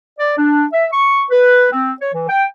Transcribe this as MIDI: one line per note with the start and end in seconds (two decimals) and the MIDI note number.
0.19 0.36 74
0.38 0.65 62
0.73 0.86 76
0.93 1.24 85
1.31 1.68 71
1.72 1.94 60
2.01 2.13 73
2.14 2.26 52
2.29 2.44 79